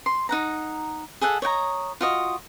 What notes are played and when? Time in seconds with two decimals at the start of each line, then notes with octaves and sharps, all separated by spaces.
0.06 C6
0.29 D#4 F#5 A#5
1.21 G#4 A4 E5 F#5
1.42 C#5 D#5 G5 A#5
2.01 F4 F#4 D#5